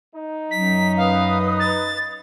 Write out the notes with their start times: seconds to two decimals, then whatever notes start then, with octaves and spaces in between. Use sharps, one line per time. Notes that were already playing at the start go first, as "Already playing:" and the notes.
0.14 D#4
0.51 F#2 F#3 B6
0.97 B4 F5 D#6
1.60 A6